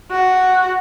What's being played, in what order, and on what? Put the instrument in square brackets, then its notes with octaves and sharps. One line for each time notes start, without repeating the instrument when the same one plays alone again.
[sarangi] F#4